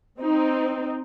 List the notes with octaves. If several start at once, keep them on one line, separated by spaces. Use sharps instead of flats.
C4 D#4